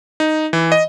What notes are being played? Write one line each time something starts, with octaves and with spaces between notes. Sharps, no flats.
D#4
E3
D#5